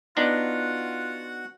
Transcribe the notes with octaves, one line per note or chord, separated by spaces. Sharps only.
B3 D4 D#4 F4 F#4 F#5